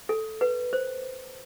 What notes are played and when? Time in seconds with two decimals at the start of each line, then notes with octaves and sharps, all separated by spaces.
0.09 A4
0.41 B4
0.73 C5